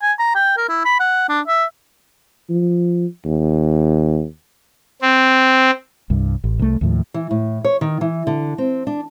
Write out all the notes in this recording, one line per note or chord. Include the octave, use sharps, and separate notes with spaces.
G#5
A#5
G5
A#4
E4
B5
F#5
D4
E5
F3
D#2
C4
C2 G2
A1
C2 A3
D#2 A2 F3
E3
A2
C#5
D#3
E3
D3
C4
D4